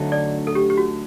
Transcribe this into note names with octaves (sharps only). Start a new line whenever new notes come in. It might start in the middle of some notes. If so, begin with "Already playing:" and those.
Already playing: D2 D3 F#3 A3 D#4
D5
A4
G4
G4
F#4